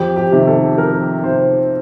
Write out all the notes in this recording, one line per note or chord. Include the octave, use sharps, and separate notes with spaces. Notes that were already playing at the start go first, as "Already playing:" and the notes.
Already playing: F2 G4
G4
C3 D#3
A4
F2 A#4
C3 D#3 C5